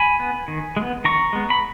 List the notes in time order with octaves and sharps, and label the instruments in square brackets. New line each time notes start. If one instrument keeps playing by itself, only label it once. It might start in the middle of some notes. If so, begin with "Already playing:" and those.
Already playing: [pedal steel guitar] G#5 B5
B3
D#3
G#3
B3
D#3 A#5 C#6
G#3 B3
B5